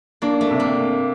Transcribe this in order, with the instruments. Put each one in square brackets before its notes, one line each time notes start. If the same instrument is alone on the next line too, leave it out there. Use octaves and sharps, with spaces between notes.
[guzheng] A#3 [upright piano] D4
[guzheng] A3
[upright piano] C3
[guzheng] A#3